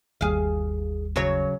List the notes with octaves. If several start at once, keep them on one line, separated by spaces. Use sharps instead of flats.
G1 D#2 G3 G#4 F5
C#3 F#3 C#5